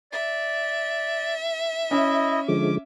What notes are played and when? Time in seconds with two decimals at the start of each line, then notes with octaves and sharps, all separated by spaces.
0.12 D5 E5
1.91 C#4 E4 D#5
2.48 D3 F3 G#3 D6